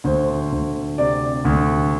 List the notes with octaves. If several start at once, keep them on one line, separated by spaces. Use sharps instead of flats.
D2 C5
D2
C3 D5
D2